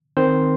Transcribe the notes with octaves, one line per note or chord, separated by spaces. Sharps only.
D#3 C4 C5